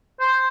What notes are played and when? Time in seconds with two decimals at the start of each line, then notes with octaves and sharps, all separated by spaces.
0.20 C5